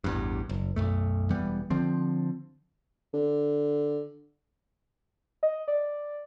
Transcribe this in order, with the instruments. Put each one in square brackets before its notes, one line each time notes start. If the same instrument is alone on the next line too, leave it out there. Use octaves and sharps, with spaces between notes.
[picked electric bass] A1 E2 G2
F#1
B1 F#2 A3
E1 E3 G3 B3
D3 F3 C4
[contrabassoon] D3
[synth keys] D#5
D5